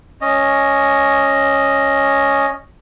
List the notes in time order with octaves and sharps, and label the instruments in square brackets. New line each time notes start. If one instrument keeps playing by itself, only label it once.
[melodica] C#4 D#5